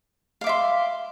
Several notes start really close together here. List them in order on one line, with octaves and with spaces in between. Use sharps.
F5 D6 E5 C6